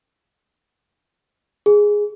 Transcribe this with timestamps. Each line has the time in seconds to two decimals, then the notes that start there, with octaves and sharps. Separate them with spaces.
1.66 G#4